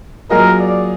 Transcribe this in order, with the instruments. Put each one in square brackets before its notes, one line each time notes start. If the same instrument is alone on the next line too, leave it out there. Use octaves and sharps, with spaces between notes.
[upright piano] F#3 A#3 F4 G#4 D#5 [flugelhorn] A#4
[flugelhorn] D5